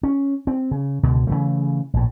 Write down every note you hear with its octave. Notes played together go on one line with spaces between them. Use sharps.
C#4
C4
C#3
C#2 B2 D3
C#3 E3 A3
A#1 A2